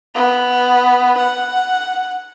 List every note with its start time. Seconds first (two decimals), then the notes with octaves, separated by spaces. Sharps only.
0.15 B3
1.17 F#5